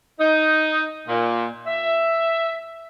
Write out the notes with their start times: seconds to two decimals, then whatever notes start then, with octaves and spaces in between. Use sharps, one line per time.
0.19 D#4
1.08 A#2
1.66 E5